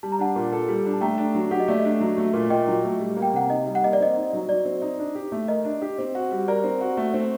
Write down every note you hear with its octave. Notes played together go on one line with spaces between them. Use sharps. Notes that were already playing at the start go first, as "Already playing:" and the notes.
G3 A5
A#5
D4 F#5 A5
A#2
A4
G3
D4
A5
A3 G5 A#5
D4
F#3
G4 F#5
D#5
A3 D5
D#5
D4
F#3
A3
A#2
A#2 D#5 G5
F#3
A3
G3
A#3
G5
C3 F#5
D#4 D#5
G3
F#5
A#3 D#5
D5
C4 D#5
D#4
F#3
F#3 D5
C4
D#4
D4
G4
A3
A#4 D#5
D4
G4
C4
F#4
G3
A#4 D5
C4
F#4
A3
C4